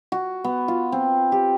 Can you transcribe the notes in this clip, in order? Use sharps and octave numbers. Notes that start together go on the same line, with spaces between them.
F#4
B3
F4
C4
G4